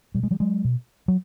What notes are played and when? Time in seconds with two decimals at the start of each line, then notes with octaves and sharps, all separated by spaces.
0.15 B2 G3
0.23 G#3
0.31 F3 G3
0.40 F#3 G#3
0.65 B2
1.08 F#3